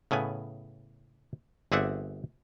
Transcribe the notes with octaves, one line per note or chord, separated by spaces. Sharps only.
A2 C#3 B3 G#5
G1 C4 G#4 D5 E5 F#5